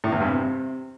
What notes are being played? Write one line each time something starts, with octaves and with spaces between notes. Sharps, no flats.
A2
E2
G2
C3